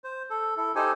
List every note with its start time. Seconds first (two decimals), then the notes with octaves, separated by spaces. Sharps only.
0.04 C5
0.30 A4
0.57 E4 A4
0.75 D#4 G4 A4 C5 G#5